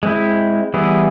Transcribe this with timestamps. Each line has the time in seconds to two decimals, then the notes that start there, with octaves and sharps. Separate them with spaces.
0.03 G#3 C4 E4
0.74 E3 G3 B3 E4 G#4